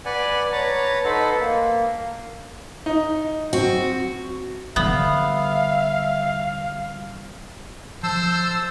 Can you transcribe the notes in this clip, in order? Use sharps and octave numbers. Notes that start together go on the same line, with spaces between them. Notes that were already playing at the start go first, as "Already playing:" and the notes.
B4 D5 F#5 G#5
B4 C#5 A5 A#5
D#4 A4 B4 C5 F#5
A#3
D#4
C4 F#4
D3 G3 B3 E5 F5
F3 C5 A5 E6